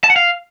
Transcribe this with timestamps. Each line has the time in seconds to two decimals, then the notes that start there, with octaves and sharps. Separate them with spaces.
0.04 A5
0.10 F#5
0.16 F5